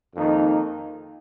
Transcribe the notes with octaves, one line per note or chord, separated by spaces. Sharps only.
F2 D#3 A#3 D#4